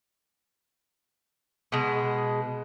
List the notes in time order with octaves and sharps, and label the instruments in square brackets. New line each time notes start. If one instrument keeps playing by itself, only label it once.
[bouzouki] B2 G#3